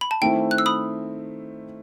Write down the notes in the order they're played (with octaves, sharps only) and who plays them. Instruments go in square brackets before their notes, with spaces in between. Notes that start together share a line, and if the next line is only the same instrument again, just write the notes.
[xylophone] B5
A5
[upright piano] D#3 A3 C4 E4 [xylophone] G5
[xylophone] F#6
E6
B5 D#6